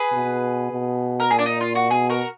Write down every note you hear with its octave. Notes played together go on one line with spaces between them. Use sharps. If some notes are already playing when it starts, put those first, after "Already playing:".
Already playing: G#4 B4
B2
B2
A#4
A#2 G#4
D4
D#4
F4
F#4
B2 G#4
F#4 A#4